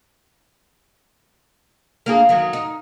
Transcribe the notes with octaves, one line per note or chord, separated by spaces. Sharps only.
A#3 D4 G#4
D#3 F#3
D#4